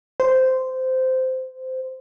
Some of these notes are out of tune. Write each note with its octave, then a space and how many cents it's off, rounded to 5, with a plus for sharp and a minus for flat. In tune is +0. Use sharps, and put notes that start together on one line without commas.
C5 -15